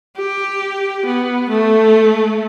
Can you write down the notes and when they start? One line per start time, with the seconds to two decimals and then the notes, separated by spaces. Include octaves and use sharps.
0.17 G4
1.05 B3
1.49 A3